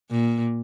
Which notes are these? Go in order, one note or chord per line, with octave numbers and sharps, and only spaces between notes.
A#2